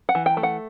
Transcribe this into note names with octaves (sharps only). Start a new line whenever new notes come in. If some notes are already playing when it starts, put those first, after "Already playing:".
F#5
E3
G5
A3
F#5